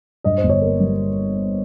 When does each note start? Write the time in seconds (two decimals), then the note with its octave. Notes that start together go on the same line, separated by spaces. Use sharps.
0.24 G2 D#5
0.38 C5
0.43 G1
0.49 C#5
0.62 A#3
0.80 G3